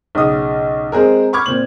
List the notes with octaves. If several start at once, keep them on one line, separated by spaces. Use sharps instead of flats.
B1 C#3 D#6
G#3 C4 G#4 A#4
B5 C#6 D6 F6 G#6
A#2 C4 F#7